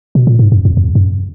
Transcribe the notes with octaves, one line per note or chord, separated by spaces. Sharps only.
B2
A#2
G#2
F#2
F2
F2
F#2